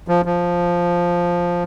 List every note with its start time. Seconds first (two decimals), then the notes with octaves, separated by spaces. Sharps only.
0.08 F3
0.25 F3